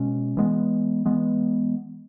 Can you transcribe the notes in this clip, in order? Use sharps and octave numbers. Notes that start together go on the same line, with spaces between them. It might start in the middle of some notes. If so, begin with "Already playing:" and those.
Already playing: B2 G#3 C#4
E3 G#3 B3
E3 G#3 B3